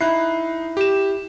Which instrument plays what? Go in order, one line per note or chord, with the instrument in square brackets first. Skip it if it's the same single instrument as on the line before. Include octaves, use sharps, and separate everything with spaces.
[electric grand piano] D#4 F#6 C7 [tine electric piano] E4
[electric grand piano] G4 E7